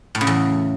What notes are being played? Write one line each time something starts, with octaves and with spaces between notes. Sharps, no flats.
A2
C#3
E2